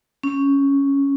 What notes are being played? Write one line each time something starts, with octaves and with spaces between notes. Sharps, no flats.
C#4